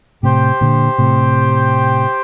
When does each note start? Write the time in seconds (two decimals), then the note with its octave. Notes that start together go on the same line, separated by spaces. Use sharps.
0.23 A2 C3 G4 C5 G5
0.61 A#2 D3
0.98 A2 C3